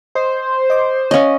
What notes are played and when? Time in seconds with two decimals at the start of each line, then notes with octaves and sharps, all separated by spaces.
0.15 C5 D#5
0.70 D#5 D6
1.11 C#4 C#5 D#5 F5